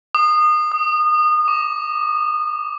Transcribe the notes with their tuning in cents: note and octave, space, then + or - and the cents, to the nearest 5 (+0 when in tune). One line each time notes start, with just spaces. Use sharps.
D#6 -25
D#6 -5
D6 +0